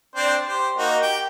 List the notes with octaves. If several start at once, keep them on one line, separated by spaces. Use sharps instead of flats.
C4 D4 C5
G4 C5
A#3 D#4 F#4
G4 G5